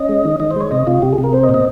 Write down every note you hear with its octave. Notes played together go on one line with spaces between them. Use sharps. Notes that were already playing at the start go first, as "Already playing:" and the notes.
Already playing: C#4 D#5
G#3
D#3
D#3 D#5
C5
G#3 C#5
C3 D#5
C3 F4
C3 G4
G#4
C3
A#4
C4 C5
D#5
A#2
D#5